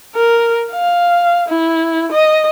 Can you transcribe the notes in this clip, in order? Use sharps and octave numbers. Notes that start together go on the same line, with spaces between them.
A#4
F5
E4
D#5